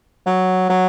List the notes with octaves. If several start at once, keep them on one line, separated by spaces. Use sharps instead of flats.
F#3
F#3